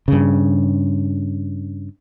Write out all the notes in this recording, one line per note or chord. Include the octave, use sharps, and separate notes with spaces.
G2 C#3